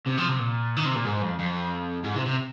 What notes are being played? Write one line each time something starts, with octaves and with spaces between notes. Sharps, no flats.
C3
F3
C3
A#2
D#3
C3
A#2
G#2
F2
F2
G#2
C3
C3